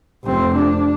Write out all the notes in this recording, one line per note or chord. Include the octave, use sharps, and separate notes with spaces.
F1 C4
D4